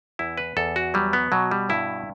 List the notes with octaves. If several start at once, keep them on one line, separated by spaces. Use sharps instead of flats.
E2 E4
B4
E2 A4
F#4
F#3 G3
B3
B2 F#3
G3
G2 E4